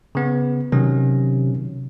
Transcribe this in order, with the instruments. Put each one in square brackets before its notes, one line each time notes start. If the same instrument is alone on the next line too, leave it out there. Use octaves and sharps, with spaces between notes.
[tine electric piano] C#3 B3
[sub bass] C3 [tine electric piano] D#3 F#3 C#4